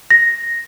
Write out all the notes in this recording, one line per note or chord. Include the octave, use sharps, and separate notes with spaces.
A#6